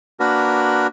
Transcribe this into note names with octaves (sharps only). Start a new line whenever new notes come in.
A#3 D4 F#4 A#4 B4